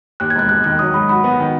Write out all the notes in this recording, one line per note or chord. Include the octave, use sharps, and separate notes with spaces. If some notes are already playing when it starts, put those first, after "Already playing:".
D#2 F#6
G#6
E1 F#6
E1 F#6
D#3 F#6
F#3 D#6
G#2 B5
F#4 B5
B3
D#3